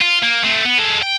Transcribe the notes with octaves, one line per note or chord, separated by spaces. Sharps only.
F4
A#3
A3 C4
B3
G#3 A4
G5